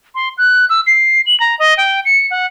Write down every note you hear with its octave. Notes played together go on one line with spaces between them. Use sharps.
C6
F#6
E6
C7
F#7
A#5
D#5
G5
C#7
F#5